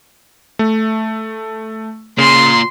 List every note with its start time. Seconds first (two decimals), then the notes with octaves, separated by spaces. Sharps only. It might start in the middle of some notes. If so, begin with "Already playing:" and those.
0.59 A3
2.18 A#2 C#3 C6